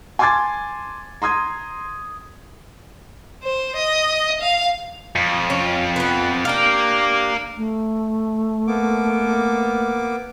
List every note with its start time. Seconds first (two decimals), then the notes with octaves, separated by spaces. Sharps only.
0.19 G#5 A5 C6 D6 G#6 A6
1.22 A#5 C6 D#6 G#6
3.44 C5
3.76 D#5
4.41 F5
5.16 F2
5.50 C#4
5.96 B3 B4
6.45 D4 G4 A#4 F5
7.56 A3
8.67 A#3 B3 D6